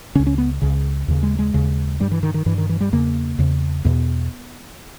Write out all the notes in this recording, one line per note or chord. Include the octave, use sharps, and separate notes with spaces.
C#2 C#3 C#4
C#4
B3
C#2 C#3
D#2 C#3
G#3
G#3
D#2 C#3
G2 G3
E3
D#3
D#3
G2 E3
D#3
E3
G3
E2 C#3 A#3
E2 C#3
E2 B2 B3